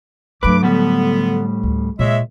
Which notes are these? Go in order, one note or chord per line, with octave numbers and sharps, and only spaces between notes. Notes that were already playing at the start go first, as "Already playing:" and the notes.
G2 F#3 A3 B4 D6
A2 D3 G3 B3
D2
A#2 G#3 C#5 E5